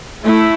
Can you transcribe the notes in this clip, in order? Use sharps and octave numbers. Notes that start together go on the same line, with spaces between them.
A3 E4